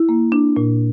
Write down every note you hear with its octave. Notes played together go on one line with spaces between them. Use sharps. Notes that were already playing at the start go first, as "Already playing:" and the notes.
Already playing: E4
A#3
D4
A#2